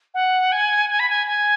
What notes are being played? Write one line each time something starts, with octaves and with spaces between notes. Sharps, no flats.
F#5
G#5
G#5
B5
G#5
G#5